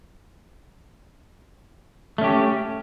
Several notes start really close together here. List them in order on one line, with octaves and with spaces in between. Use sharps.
A3 C#4 G4